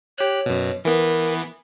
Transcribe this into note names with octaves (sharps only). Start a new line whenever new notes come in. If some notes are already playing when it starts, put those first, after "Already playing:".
G4 C#5 F#6
F#2 B2
E3 B3 A#4